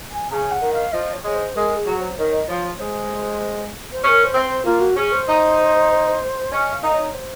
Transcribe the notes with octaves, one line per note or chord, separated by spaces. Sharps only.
G#5
C#3 G#5 A#5
F#5
D#3
F5
F3 D#5
C#5
G#3
C#5
C5
G#3 A#4
G#4
F#3
C#5
C5
D#3 C#5
D#5
F3 C#5
C#5
G#3 C5
C5
C#4 C5
A#4
C5
C4
C5
A#3 F4
F#4
C#4 G#4
C5
D#4
C#4 D#5
F5
D#4
C#5
C5